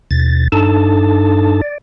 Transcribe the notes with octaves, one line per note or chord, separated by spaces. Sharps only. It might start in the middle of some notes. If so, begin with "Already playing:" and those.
D#2 B2 A6
G2 D4 D#4 A4 A5
D5